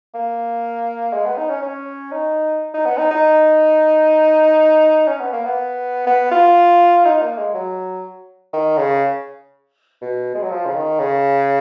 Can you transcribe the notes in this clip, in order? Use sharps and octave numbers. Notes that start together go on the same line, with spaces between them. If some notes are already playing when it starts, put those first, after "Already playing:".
A#3
G#3
B3
D#4
C#4
C#4
D#4
D#4
B3
D#4
D#4
C#4
B3
A#3
B3
B3
F4
D#4
A#3
G#3
F#3
D#3
C#3
B2
G#3
F#3
F3
C#3
D#3
C#3